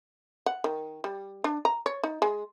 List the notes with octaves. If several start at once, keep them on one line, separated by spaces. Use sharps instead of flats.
F#5
D#3
G3
D4
A#5
C#5
D#4
G#3